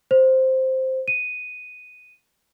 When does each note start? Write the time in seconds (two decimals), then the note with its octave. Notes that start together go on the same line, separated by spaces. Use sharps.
0.11 C5
1.08 D#7